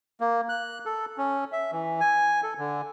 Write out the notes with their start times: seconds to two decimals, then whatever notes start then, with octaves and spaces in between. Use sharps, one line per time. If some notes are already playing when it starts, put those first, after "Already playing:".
0.21 A#3
0.49 F#6
0.86 A4
1.18 C#4
1.52 E5
1.72 E3
2.01 G#5
2.43 A4
2.58 D3